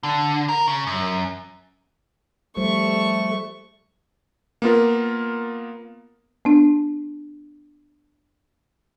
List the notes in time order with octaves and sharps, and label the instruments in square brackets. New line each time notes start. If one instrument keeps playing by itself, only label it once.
[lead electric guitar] D3
A#4
C#3
F#2
[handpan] F3 G3 C5 [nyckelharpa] A3 C#6
[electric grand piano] A#3 B3 F4 A#4
[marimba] B3 D4